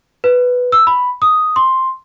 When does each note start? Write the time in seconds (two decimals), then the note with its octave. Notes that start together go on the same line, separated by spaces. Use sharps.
0.24 B4
0.72 E6
0.87 B5
1.22 D#6
1.56 C6